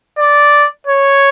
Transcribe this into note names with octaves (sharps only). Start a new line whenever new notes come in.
D5
C#5